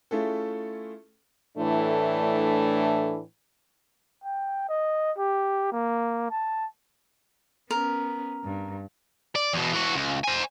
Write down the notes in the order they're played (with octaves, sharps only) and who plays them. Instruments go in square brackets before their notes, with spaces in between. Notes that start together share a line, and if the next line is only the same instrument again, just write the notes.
[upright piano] A3 C#4 E4 F4 G#4 A4
[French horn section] A2 E3 A3 D4
[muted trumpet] G5
D#5
G4
A#3
A5
[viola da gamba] B3 C#4 [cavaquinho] A#4
[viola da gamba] G2
[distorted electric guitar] D5
E2 B2
E3 F#4
C#2
C5 G#5